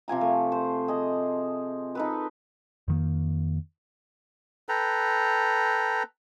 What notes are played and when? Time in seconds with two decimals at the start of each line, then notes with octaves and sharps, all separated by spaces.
0.08 C3 F3 G#5 A#5
0.21 A3
0.52 C5
0.88 G#4 D#5
1.95 D#4 A4 B4
2.88 F2 D#3 A#3
4.69 A4 B4 G5 A#5